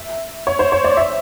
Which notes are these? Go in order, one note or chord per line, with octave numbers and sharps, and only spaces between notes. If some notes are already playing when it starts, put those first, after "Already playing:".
Already playing: E5
C#5
C5
C#5
D5
E5